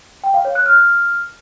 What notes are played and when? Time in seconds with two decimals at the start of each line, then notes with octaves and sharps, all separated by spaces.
0.24 G5
0.34 F5
0.45 C#5
0.55 F#6
0.66 F6